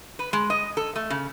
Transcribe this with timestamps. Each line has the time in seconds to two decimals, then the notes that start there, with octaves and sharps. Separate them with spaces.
0.19 B4
0.33 G#3
0.50 D#5
0.77 A4
0.96 A3
1.10 C#3